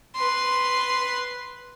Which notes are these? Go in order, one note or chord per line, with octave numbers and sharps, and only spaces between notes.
B4 C6